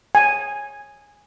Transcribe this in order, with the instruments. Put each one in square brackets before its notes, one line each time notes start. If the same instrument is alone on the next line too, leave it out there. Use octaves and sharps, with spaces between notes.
[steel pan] G#5